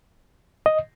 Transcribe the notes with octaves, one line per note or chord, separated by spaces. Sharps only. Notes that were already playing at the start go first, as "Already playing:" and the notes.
D#5